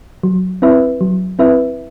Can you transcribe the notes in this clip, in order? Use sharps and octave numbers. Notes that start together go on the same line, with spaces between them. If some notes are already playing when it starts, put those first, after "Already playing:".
F#3
C4 E4 B4 E5
F#3
C4 E4 B4 E5